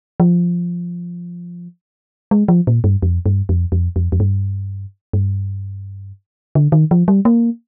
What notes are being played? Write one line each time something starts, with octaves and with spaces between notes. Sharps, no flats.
F3
G#3
F3
A#2
G2
F2
G2
F2
F2
F2
F2
G2
G2
D3
D#3
F3
G3
A#3